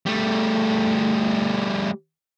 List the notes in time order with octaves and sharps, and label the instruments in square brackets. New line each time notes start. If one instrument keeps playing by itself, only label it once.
[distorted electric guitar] G3 A3